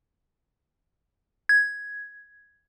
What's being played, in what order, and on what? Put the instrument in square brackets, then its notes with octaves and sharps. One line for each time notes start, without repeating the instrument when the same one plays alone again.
[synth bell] G#6